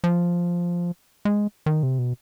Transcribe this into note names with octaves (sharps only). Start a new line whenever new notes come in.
F3
G#3
D#3
C3
B2